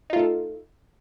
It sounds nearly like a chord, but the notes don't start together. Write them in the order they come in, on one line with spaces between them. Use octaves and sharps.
D#4 F4 A3 A4